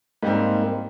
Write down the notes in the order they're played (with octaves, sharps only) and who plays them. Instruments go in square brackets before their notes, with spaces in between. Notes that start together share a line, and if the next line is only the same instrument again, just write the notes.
[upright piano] G#2 G3 C4 [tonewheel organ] A#3 D#4